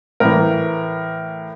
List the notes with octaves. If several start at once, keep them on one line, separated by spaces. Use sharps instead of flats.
A2 E3 A#4